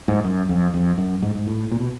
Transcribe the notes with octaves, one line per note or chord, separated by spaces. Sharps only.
G#2
F#2
F2
F2
F#2
G#2
G#2
A2
A#2
B2